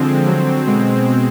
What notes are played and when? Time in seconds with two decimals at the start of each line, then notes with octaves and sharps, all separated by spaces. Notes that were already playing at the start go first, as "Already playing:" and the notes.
Already playing: D3 F3 G#3 C4
0.27 D3 F#3
0.67 B2 G#3